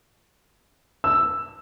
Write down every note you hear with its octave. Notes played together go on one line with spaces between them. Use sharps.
E6